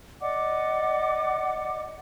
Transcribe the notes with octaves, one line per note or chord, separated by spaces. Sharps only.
D5 D#5 F#5 D6